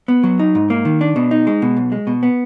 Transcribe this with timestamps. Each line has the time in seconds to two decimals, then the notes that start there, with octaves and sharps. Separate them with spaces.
0.08 B3
0.24 F#3
0.39 D#4
0.55 G#2
0.70 A#3
0.85 D#3
1.01 D4
1.16 B2
1.31 D#4
1.47 G#3
1.62 B2
1.77 B1
1.92 G#3
2.07 B2
2.23 B3